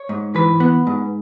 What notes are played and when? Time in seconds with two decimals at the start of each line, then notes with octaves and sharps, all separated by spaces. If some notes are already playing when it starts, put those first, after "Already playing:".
Already playing: C#5
0.09 G#2
0.35 E3 B4
0.60 B3
0.87 G#2